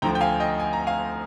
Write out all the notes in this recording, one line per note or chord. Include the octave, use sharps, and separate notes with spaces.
D2 D3 F3 G5 A#5
G5
F5 G#5
D#5 G5
G#5
A#5
F5 G#5